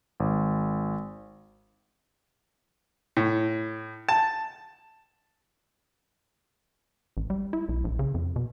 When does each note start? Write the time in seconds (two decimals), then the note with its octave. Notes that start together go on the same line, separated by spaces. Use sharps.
0.20 G#1
3.17 A2
4.09 A5
7.17 A1
7.30 G3
7.53 E4
7.69 B1
7.84 A#1
7.99 C#3
8.14 F2
8.36 B2